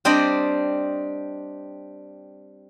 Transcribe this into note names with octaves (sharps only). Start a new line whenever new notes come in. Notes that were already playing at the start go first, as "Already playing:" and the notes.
G3 C4 D4 C5 D5 D#5